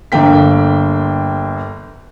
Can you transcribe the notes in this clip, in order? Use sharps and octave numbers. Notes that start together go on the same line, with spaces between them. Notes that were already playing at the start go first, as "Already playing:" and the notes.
G1 D3 A#3 G5 B6